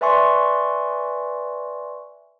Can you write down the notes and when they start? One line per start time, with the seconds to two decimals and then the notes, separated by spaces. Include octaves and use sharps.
0.01 B4 D5 E5 G#5 C6 C#6